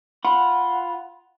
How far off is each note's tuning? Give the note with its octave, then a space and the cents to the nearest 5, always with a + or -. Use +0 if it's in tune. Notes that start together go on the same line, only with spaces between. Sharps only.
F4 +0 F#5 +0 B5 -10